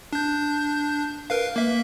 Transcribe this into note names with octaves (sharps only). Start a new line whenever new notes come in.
D4 G6
A#4 B4 F5
A#3 E5